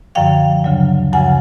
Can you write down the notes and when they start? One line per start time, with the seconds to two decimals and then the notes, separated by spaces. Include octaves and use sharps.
0.15 F#2 D3 F3 F5 G5
0.64 D2 C#3 F#3
1.13 F#2 C#3 F3 F#5 G#5